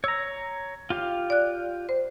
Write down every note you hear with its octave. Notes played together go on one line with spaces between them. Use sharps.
C#5 A#5 E6
F4 G4 F5
D5 F#6
C5